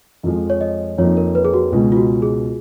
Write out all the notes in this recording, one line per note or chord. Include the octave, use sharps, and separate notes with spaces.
F2 F3 G#3
C#5
D#5
F2 F3 A#3 D#4 C#5
A#4
B4
G#4
F#4
C#2 B2 G#3 F4
F4
F#4
G#4